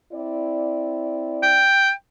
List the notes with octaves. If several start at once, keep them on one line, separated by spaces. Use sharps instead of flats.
C4 E4 D5
G5